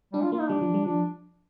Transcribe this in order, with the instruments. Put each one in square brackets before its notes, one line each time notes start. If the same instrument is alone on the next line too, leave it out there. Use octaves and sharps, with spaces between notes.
[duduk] G3 [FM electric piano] D4
[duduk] F4
[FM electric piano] A#3 [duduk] F4
[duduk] D#4
[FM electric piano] G3 [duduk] D4
[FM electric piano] F3
G3
[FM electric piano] F3 [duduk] D4